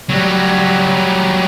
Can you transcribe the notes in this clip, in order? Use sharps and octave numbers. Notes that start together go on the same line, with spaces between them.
F#3 G3